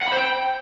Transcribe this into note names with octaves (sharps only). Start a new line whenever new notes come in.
F#5
B5
C5
G5